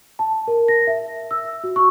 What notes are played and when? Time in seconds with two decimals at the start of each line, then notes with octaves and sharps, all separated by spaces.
0.19 A5
0.48 A#4
0.68 A#6
0.87 E5
1.31 E6
1.64 F#4
1.76 C#6